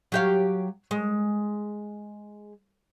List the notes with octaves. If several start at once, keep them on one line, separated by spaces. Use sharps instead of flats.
F#3 G4 F5
G#3